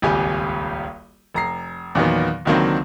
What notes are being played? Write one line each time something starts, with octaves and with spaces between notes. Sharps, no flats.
D#1 G#1 C#2 G4 G#5
F1 A#5 C7
E2 A#2 D#3 F#3 B3
C#2 D3 D#3 F#3 A#3 C4